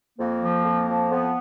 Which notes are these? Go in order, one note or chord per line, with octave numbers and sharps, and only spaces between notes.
F2 A#3
F3
F2
F3
F2 B3